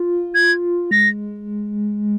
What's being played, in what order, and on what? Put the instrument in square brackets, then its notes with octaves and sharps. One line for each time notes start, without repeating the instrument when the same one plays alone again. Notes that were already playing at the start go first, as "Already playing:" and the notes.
Already playing: [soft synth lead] F4
[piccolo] G#6
[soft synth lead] G#3 [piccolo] A#6